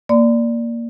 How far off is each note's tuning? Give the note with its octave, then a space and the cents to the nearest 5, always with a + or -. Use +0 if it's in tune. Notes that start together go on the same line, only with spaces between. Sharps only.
A#3 +0 D5 +0 C6 -35